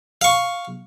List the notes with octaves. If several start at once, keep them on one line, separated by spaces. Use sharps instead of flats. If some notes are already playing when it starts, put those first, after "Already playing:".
F5 C#6